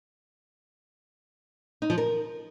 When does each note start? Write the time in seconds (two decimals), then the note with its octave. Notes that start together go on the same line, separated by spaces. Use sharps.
1.82 D#4
1.90 F3
1.98 A#4